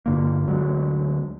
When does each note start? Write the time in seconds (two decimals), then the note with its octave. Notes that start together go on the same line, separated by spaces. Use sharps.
0.06 G2 D3 A#3
0.48 D2 F#3 G#3